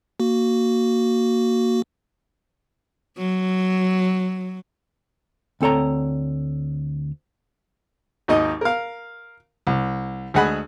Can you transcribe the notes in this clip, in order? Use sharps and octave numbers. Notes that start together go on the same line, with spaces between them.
A#3 F#4
F#3
D2 C4 A4 C#5 A#5
G#1 D#2 D#4 D#5
A#4 F5
C2
D2 G#3 G#4 F#5 G#5 B5